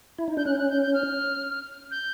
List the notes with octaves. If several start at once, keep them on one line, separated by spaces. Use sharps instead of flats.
E4
D#4
D4 G6
C#4 F#6
G6
F#6
G6
G6
F6
G6